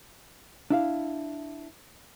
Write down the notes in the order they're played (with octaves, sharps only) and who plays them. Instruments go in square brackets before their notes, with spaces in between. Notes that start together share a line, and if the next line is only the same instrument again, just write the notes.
[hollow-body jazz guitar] D4 E4 F5